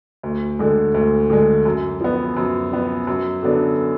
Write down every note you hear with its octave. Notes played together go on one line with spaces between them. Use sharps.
D2
D3 G#3
D2
D3 G#3
F#2
F3 B3
F#2
F3 B3
F#2
D3 F#3 B3 D4